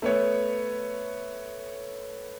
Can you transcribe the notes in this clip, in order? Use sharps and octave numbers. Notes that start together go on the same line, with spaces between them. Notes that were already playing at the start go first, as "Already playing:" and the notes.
A3 B3 C#5